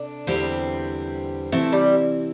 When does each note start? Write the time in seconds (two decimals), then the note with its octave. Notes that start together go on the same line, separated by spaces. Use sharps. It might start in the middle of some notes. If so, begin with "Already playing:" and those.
Already playing: C3 D4 A4
0.27 E2 D3 G3 C4 E4 G4
1.52 C3 E3 A3 C4 E4
1.72 G3